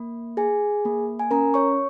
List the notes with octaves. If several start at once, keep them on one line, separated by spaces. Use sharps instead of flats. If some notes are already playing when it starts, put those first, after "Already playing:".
Already playing: A#3
G#4 G#5
A#3
G#5
C#4 A#4 A#5
C#5 C#6